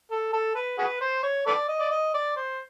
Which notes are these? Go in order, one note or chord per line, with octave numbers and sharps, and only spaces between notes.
A4
A4
B4
F#4 G#4 B4
C5
C#5
A4 B4 D5
D#5
D5
D#5
D5
C5